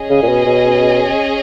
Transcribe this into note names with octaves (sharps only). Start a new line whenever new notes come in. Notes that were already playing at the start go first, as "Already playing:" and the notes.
Already playing: C#4 G#4 D#5
C#3
A#2
B2
B2